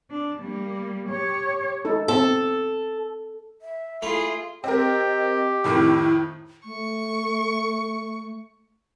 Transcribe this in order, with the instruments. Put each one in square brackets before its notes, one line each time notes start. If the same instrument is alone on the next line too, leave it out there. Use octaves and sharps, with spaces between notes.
[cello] D4
G3 A#3
G4 C#5
[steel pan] D#4 A4
[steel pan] C4 [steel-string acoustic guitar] A4
[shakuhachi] E5
[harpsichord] A3 E4 F5 [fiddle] F4 G#4
[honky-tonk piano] C4 A#4 [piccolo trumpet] G4 [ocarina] D#5
[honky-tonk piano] F2 A2 D#3 [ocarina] E4
[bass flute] A3 [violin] C#6